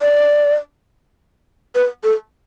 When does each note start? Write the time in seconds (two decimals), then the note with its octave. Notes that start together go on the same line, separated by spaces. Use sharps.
0.02 D5
1.75 B4
2.04 A4